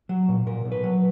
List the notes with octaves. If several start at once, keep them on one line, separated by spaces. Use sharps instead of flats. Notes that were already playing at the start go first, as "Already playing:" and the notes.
F#3
A#2
A#2 A#4
B1
B4
F#3